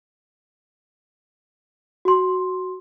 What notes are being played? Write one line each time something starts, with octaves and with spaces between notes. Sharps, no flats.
F#4 C6